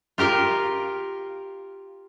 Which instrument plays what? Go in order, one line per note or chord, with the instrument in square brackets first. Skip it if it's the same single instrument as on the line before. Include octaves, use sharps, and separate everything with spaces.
[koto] F4 G4 A#4 F5